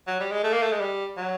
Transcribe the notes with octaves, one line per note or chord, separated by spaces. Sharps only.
F#3
G3
G#3
A3
A#3
A3
G#3
G3
F#3